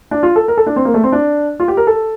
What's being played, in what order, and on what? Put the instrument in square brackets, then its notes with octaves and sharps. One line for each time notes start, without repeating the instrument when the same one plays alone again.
[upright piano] D4
F4
A4
A#4
A4
D4
C4
A#3
A3
C4
D4
F4
G4
A#4
A4